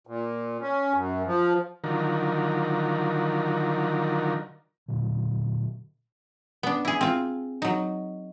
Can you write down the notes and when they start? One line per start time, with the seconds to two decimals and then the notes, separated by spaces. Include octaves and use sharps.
0.07 A#2
0.61 C#4
0.94 F#2
1.26 F3
1.84 D3 D#3 F3 F#3 A#4
4.88 A#2 D3 F#3
6.63 B3 D4
6.85 E4 G#4
7.01 C4 F4
7.62 F#3 D#4